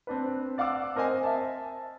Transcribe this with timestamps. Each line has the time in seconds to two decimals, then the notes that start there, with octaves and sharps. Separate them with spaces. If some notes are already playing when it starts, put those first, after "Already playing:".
0.07 C4 D4 B4
0.58 D5 F5 F#5 D6 E6
0.95 C4 A#4 C5 D#5 G#5
1.23 E5 A5